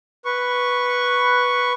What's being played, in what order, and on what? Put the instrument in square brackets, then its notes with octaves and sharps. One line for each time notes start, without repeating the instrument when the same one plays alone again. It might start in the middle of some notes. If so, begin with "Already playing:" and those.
[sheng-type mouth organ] B4 C#6